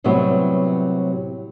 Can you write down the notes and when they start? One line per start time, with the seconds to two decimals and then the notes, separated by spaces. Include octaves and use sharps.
0.04 A2 C3 F#3 G3 B3